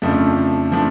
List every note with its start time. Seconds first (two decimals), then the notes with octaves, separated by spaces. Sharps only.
0.02 F2 C#3 F3 A3 D4
0.71 C#3 F3 A3 D4